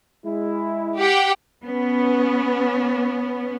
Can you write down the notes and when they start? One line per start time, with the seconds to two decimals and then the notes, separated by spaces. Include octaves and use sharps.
0.25 G#3 E4
0.99 G4 F#5 G5
1.64 B3 C#4